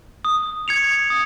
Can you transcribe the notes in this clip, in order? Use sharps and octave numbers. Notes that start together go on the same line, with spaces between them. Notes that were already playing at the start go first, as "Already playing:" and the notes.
D#6
G#6 C#7 F7
D#6